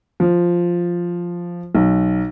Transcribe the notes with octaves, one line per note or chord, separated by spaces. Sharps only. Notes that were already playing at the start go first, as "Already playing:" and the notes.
F3
B1